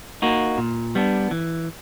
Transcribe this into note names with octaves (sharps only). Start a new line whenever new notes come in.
A#3 D#4 F#4
A#2
G3 B3 D4
E3